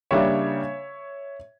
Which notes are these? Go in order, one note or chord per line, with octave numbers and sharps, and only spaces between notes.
C#3 G3 A#3 D4 C#5 E5